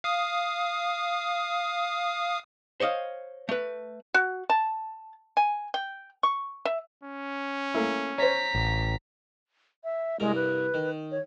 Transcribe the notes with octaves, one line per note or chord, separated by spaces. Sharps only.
F5 D#6
C5 C#5 D#5 F5
A3 B4
F#4
A5
G#5
G5
C#6
E5
C#4
A3 A#3 E4
C5 C#5 A#5 B6
A1
E5
C2 G2 G#3 A#4
B4
D#3
C#5